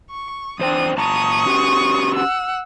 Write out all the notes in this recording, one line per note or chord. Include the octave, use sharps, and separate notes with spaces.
C#6
E2 D4 C5 G5 D#6
A#2 A5 A#5 C#6 D#6
C#4 F#4 G4
F#5 E6